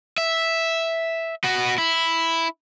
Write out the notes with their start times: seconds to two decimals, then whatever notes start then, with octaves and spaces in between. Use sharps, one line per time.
0.18 E5
1.44 B3 F#4
1.78 E4